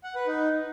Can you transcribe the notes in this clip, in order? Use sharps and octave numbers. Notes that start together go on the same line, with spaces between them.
F#5
B4
D#4